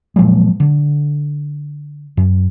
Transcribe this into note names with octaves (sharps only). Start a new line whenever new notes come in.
A#2 F3 F#3 G#3
D3
F#2